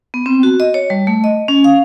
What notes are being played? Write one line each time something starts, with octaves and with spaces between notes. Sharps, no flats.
B3
C4
F#4
D#5
C#5
G3
A3
D#5
C#4
F5